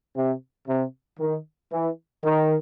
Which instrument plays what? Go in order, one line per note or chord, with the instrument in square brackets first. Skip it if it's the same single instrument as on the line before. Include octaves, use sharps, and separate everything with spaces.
[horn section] C3
C3
D#3
E3
D#3